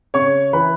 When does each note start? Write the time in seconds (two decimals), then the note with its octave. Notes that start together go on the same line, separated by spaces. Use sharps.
0.14 C#3 C#5 C#6
0.53 E3 B4 B5